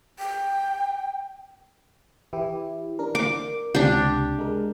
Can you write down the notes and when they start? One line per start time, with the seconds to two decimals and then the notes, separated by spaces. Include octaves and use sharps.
0.19 G5
2.33 E3 E4 G4
2.99 D4 A#4
3.15 D6
3.75 C#2 C3 D4 G4
4.39 G#3 A#4